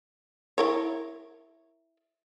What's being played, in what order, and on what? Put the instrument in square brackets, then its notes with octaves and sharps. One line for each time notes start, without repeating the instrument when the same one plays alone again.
[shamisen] E4 A#4 C#5